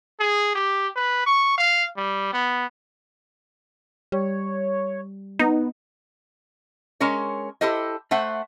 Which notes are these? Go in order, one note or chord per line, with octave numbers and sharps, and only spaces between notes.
G#4
G4
B4
C#6
F5
G3
B3
G3 C#5
B3 D#4
G#3 C#4 A#4 C#5
E4 G4 A4 C5 D#5
A3 C5 E5 F#5